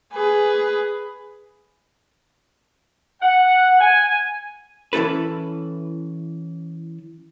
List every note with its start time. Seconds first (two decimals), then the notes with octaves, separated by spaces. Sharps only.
0.13 G#4 B4
3.22 F#5
3.80 G#5
4.93 E3 C#4 E4 A4 B4